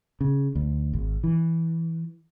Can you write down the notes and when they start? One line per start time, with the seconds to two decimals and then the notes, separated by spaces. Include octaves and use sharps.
0.21 C#3
0.55 D2
0.93 G#1
1.24 E3